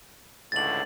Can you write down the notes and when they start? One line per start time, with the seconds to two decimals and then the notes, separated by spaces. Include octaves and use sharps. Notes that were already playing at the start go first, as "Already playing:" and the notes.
0.52 C#2 A2 D3 A6 F#7